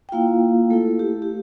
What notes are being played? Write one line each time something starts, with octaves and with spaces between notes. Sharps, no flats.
G5
A#3 E4 F4 F5
A3 E4 A4
G4
G4